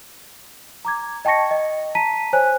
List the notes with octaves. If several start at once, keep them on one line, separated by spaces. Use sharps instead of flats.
A#5 D6 G#6
D#5 G5 A5 C#6 A#6 C#7
D#5
A5 A#5 B6 D#7
C5 C#5 G#5 F#6